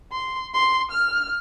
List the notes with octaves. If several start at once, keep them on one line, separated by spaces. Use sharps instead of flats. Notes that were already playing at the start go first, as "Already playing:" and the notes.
C6
C6
F6